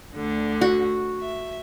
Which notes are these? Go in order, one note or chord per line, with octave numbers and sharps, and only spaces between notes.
D2 D3
F#4
E5